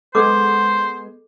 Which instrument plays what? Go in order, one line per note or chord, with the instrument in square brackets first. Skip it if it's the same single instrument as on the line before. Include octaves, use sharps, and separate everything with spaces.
[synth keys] G#3 B3 G#4 [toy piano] A4 D6 [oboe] C5